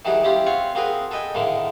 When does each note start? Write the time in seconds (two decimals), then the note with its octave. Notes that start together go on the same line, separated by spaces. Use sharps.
0.05 D#3 E3 G3 A3 F#4 G#4
0.23 G3 C#4 E4 F4 G4
0.47 C4 F4 C#5 F#5 C#6
0.75 A#3 C4 F#4 G#4 A#4 B4
1.11 A4 B4 D#5 G5 G#5
1.35 A2 D3 D#3 G#3 A#3